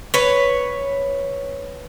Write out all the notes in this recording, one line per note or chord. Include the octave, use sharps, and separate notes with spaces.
B4 C#5